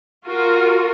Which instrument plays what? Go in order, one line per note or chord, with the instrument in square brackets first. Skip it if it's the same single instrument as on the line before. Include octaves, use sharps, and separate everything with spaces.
[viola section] F4 F#4 A#4